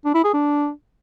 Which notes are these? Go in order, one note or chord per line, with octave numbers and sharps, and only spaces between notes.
D4
E4
G#4
D4